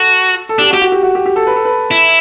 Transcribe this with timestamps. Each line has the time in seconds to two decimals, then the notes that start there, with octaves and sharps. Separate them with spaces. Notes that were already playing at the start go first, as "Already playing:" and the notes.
Already playing: F#4 A4
0.49 A4
0.59 D4 G4
0.70 F#4
0.73 G4
0.82 F#4
0.92 G4
1.03 F#4
1.15 G4
1.26 G4
1.36 A4
1.47 B4
1.56 A4
1.65 B4
1.91 E4